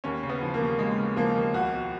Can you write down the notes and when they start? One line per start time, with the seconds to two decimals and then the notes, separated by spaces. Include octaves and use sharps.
0.04 D#2 C#4
0.23 C#3
0.29 B3
0.42 F3
0.54 A#3
0.60 D#2
0.79 D#2 G#3
0.98 C#3
1.17 F3 A#3
1.36 D#2
1.54 C#2 F#4
1.72 B2